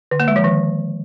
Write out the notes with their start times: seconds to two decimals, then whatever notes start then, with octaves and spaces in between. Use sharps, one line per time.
0.11 D3
0.20 A#3
0.28 G#3
0.36 F3
0.44 D#3